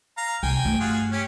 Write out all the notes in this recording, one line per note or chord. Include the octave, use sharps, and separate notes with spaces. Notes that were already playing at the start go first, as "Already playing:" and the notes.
F5 A#5
C2 G5 G#5
G2 A3
F4 F#4 G#4
C#4 G4